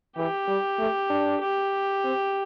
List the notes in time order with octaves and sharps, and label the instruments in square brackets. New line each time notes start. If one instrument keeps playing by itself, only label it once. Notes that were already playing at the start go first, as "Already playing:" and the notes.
[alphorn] E3 [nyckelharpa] G4
[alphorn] G3
A3
D4
[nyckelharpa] G4
[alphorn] C4